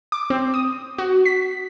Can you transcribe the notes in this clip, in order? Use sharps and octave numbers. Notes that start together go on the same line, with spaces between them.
D6
C4
D#6
F#4
B6